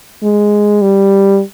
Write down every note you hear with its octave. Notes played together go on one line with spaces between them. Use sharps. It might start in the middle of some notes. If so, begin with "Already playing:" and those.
G#3
G3